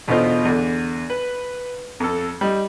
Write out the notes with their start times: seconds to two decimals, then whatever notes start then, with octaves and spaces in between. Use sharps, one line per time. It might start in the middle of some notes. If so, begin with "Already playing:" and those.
0.08 E2 B2 D3 D#4 F4 C5
0.45 E2 D3
1.10 B4
2.00 F2 A4
2.41 G3 D#4